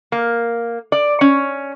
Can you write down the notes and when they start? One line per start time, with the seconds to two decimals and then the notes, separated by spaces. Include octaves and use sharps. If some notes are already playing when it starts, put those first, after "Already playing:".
0.12 A#3
0.92 D5
1.21 C#4